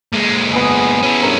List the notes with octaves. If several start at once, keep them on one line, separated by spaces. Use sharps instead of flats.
A#2 G#3
B3 G#4
C#4 E4
G2 A#4 C#5